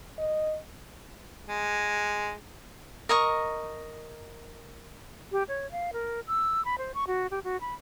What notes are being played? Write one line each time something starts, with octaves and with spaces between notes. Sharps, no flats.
D#5
G#3
A#4 D#5 C#6
G4
C#5
F5
A#4
E6
B5
C5
C#6
F#4
G4
F#4
B5